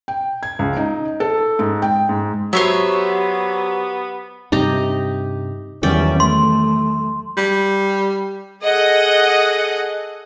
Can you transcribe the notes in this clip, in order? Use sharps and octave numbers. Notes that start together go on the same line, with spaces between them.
G5
G#6
C#2
D#4
A4
G#2
G5
G#2
F#3 B3 G4 C5 C#5 E5
G2 C3 D#4 G4 A#5
E2 D#3 F#3 G3 C#4 D5 E5 G5
A3 C6
G3
G#4 A4 D#5 F#5